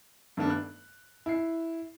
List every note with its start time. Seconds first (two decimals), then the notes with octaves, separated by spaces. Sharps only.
0.37 G2 D#3 A3 B3 D4
0.50 F#6
1.26 E4 C7